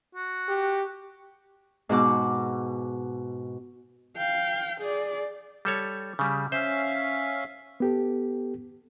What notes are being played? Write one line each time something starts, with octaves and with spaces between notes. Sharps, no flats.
F#4
G4
G#2 B2 F#4 D6
F5 G5
G#4 D5
G3 A4 C#5
C#3 G3
C#4 C5 E5 F5
B3 G4 A4